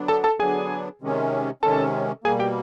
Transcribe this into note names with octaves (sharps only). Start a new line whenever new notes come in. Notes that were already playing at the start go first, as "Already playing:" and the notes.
Already playing: D3 F#3 B3 D4
A4 A5
A4 A5
D3 F#3 B3 D4 G#4 G#5
C3 D#3 G#3 C#4
C3 D#3 G#3 C#4 A4 A5
B2 G3 A#3 G#4 G#5
G4 G5